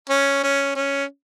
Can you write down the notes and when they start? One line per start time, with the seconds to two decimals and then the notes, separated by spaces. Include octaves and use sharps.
0.10 C#4
0.44 C#4
0.76 C#4